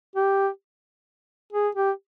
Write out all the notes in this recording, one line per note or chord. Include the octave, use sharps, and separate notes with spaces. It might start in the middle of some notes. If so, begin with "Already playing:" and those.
G4
G#4
G4